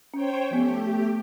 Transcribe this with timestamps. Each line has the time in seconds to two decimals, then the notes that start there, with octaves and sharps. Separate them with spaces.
0.14 C#4 C5 C#5 G5
0.51 F3 A3 B3 G4